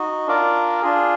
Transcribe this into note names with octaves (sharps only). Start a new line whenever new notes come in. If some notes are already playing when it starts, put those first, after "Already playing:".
Already playing: D#4 F#4
D4 F4 A#4 D5
D4 F4 G#4